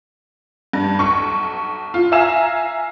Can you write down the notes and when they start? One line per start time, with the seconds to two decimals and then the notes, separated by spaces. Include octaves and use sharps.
0.73 G2
0.99 B1 C#6
1.94 F4
2.12 E5 F5 G#5 A#5 E6 E7